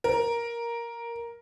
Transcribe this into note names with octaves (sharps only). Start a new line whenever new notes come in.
A#4